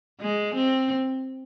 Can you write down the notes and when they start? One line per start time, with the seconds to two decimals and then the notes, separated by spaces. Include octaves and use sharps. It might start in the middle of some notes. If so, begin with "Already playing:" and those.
0.21 G#3
0.55 C4